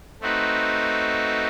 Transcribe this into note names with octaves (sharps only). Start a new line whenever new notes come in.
A3 C4 D#4 F#4 B4